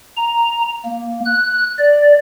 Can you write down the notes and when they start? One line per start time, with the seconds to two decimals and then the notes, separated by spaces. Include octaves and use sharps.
0.17 A#5
0.85 A#3
1.25 F#6
1.79 D5